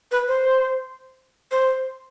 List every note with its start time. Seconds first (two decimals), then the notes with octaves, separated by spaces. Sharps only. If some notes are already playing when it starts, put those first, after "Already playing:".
0.12 B4
0.28 C5
1.52 C5